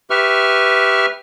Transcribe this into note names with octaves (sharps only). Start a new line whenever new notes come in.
G4 B4 E5 C#6 F6